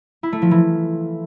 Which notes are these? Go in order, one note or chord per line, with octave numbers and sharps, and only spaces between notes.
E4
A3
F3
E3